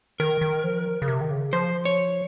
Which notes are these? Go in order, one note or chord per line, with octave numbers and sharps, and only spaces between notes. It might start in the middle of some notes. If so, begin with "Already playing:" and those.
D#3 A#4
D#3
F3
C#3
C3
D#3
C#3
F3 C5
C#5